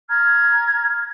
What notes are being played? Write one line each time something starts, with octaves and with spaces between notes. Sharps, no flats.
A#5 F6 G#6